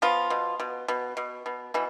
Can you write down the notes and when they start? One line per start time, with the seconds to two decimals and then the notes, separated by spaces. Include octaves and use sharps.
0.02 F3 B3 F4
0.30 B2
0.60 B2
0.88 B2
1.17 B2
1.46 B2
1.74 B2 E3